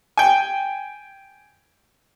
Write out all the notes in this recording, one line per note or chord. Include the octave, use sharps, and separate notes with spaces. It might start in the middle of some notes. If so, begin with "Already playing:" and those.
G5 G#5